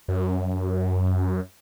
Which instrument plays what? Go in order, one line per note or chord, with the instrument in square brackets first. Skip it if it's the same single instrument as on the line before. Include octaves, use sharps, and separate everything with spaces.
[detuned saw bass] F#2